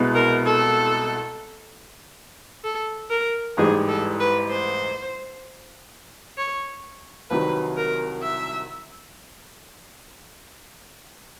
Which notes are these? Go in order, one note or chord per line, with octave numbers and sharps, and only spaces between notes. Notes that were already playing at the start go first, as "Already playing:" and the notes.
Already playing: C2 B2 G#3 B3 E4
A#4
A4
A4
A#4
A1 G#2 E3 G3 G#4
A4
B4
C5
C#5
C2 C3 D#3 F#3 B4
A#4
E5